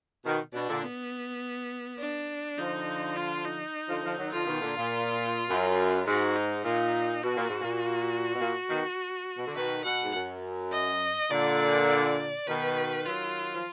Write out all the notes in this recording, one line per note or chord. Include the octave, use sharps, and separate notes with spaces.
B2 D#3
B2 D4
A#2 D3
B3
D4
D3 F3 D#4
F4
D#4
D3 F3
D3 F3
D#3 F#3
D3 F3 F4
B2 D#3
A#2 D3
A#2
F#2
G#2 F#4
D#4
A#2 D#4
B2 F#4
A#2
G#2
A#2
B2
A#2
B2 D#3
B2
D3
B2 D#3 B4
B2 F#5
G#2
F#2
D#5
A#2 D3 D5
D5
B2 D#3 B4
D#3 F#3 F4
F3